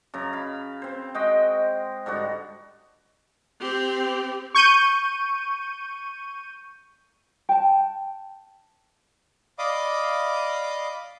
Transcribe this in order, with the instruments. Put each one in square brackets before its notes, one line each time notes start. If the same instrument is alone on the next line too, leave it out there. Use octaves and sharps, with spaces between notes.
[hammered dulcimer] F#2 C#3 A#5
F5 B5
C4 C5
G#3 F#4 D#5 G5
G#2 D3 G3 F#4
[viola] C4 G4
[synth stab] C#6 G6 D#7
[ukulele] G5 A5
[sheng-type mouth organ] D5 D#5 F5 B5 D6 D#6